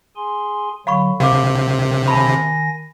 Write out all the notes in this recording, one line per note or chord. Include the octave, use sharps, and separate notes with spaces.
G#4 G#5 C6
D3 F#3 F5 B5 C#6
C3 A#4 F5 D6
D#3 G#5 A5 B5 A#6